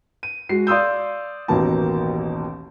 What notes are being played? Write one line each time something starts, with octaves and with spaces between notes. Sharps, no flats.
D#7
G#3 F#4 C7
D5 F5 C6 D#6 E6 G6
A1 D#2 B2 A#3 A5